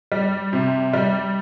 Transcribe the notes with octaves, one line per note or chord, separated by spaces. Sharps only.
G3
C3
G3